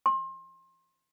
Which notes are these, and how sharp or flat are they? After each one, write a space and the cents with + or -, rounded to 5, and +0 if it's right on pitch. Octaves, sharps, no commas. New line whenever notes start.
C6 +30